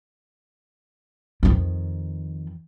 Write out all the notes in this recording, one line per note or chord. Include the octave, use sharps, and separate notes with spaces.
F2 D#3